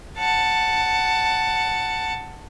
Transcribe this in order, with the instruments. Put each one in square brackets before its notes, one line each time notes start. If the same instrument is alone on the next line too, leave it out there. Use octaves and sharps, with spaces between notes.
[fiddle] F#5 A5